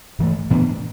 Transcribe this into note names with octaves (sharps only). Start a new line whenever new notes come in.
G#2 E3 A3
A2 E3 B3 D4